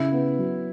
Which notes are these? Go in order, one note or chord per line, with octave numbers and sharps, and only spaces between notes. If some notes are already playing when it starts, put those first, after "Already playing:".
Already playing: C#3 E4
B3
F#3